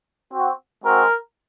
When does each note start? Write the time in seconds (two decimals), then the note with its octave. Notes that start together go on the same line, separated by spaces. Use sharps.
0.32 C4 F#4
0.84 G#3 C4 F#4 A#4